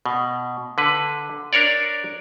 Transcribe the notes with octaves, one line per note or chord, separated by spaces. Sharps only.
B2
D3 B4
D4 A#4 C#5 D5